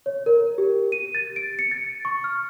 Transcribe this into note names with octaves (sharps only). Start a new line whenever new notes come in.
C#5
A#4
G4
D#7
A6
D7
C#7
A6
C#6
F6